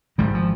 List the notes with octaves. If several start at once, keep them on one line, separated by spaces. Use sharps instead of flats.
G#1 G#2 D#3 G3
F3